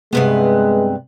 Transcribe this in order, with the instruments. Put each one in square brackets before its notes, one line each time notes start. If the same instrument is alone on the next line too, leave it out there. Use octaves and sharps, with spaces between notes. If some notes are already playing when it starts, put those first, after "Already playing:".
[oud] G2 C3 B3 [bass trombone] G#3